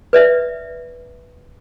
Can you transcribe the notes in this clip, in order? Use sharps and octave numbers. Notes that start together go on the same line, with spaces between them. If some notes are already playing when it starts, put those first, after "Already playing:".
B4 D5 E5